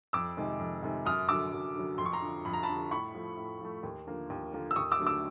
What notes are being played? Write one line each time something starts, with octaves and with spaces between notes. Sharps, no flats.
F2 D6 E6
C3 D#3 G#3
F2
C3 D#3 G#3
F#2 D#6 F6
D3 F#3 D6 E6
F#2
D3 F#3
F2 C6
C#6
A#5 C6
D3 F3
F2 B5
A#5
A5 B5
D3 F3
A2 B5 C#6
F3 A3
A2
F3 A3
D#2
D3 F3 A#3
D#2
D3 F3 A#3
E6
D#2 C#6 D#6
D6 E6
D3 F#3 A3
D6 E6